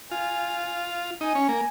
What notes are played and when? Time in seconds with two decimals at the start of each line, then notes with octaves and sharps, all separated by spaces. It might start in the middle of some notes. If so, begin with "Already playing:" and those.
0.11 F4 G#5
1.21 D#4 G#5
1.35 C#4
1.49 A#3